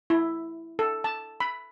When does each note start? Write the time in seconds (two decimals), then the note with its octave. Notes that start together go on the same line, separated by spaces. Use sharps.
0.10 E4
0.79 A4
1.04 A5
1.40 B5